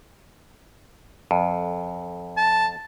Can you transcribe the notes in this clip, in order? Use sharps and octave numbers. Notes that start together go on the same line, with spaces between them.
F2
A5